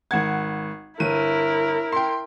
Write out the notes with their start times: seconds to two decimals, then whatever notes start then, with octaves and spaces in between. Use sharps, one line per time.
0.11 G#1 F#5 G#6
1.00 G1 E4 A#4 D#7
1.92 G5 C6